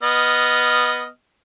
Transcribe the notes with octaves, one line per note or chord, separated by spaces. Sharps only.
B3 D#5 F6